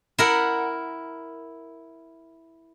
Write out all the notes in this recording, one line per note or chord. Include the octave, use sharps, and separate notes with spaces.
E4 A#4 F#5